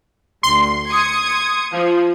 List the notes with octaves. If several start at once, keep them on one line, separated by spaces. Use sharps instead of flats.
D2 C6
D#6 G#6 C#7
F3